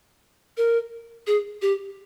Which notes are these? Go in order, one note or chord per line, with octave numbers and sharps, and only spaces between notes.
A#4
G#4
G4